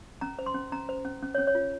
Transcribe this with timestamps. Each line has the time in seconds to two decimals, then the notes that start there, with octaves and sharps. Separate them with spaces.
0.21 C#4 A#5
0.39 C5
0.46 C6
0.54 C#4
0.72 C#4 A#5
0.89 C5
1.05 C#4
1.23 C#4
1.35 C#4 C#5
1.47 C#5
1.55 F4